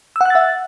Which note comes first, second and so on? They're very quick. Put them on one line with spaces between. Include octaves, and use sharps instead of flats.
E6 F#5 F#6 A6 E5